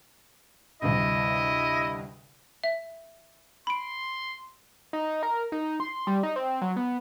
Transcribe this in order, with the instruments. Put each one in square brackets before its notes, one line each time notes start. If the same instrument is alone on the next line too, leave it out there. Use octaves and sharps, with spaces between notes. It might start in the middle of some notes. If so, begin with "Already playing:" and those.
[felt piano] D2 G2 C3 [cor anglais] E4 [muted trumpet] D#5
[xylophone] E5
[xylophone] B5 D7 [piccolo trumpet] C6
[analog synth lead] D#4
A#4
D#4
C6
G3
D#4
C4
F#3
B3